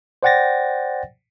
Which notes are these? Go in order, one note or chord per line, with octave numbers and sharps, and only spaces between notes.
C5 D5 F#5 G5 A6 A#6